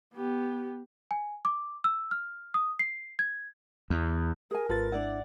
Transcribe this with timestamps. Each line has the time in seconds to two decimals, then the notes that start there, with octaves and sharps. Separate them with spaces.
0.14 B3 G4
1.11 G#5
1.45 D6
1.84 E6
2.11 F6
2.54 D#6
2.79 C7
3.19 G#6
3.90 E2
4.51 G#4 A#4 G#5
4.69 G#1 G#2 F4 A4 B4 A6
4.92 D4 E4 D5 F#5